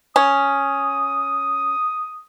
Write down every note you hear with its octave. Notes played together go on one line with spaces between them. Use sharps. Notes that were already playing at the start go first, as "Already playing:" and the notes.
C#4 D#6